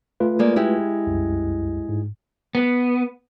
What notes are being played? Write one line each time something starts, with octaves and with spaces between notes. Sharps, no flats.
A3 F4 B4
G#3 A#3 D5
G#3 E4 G4
C2 F#2
G#2
B3